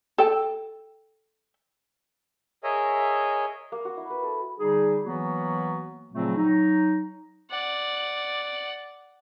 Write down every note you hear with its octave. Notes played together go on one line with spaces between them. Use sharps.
A4 G5
G#4 A#4 C#5 D#5 E5 G#5
A#3
F#4
E4
B4
A4
D3 G3 D#4 G#4
E3 F#3 A#3 B3 F#4
A#2 C#3 F3 F#3 A3 C4
F#3 D#4
D5 F#5